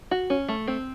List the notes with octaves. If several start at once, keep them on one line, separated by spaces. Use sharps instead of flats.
F#4
C#4
A3
C4